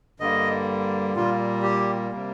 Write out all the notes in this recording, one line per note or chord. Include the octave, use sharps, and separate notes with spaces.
G2 D3 G3 A#3 D#5
A#2 G3 A#3 F4
G4
C3 G3 A#3